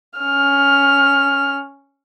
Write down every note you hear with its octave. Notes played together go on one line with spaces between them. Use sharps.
C#4 F6